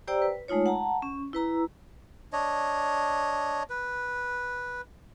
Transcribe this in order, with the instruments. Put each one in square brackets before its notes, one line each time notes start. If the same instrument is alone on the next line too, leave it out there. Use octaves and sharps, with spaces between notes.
[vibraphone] G4 C5 D5 G5 A#5 E6
B4
G#3 A3 D#4 F4 C#5
F#5 A5 A#5
C#4
E4 B4 A#5 E6
[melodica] D4 C#5 D#5
B4